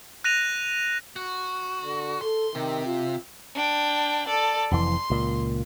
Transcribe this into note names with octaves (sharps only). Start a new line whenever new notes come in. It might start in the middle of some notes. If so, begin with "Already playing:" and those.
F#6 A#6 D#7 F7
F#4
D3
A4 C6
C3 D#3
F4
D4 G5
A4 D5
F1 F2 E3 C6
C#2 A#2